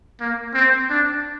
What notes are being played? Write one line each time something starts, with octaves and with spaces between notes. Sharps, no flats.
A#3
C4
D4